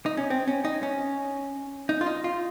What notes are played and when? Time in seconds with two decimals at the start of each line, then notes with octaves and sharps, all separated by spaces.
0.06 D#4
0.17 C#4
0.30 C4
0.47 C#4
0.65 D#4
0.83 C#4
1.89 D#4
2.01 F4
2.06 D#4
2.24 F4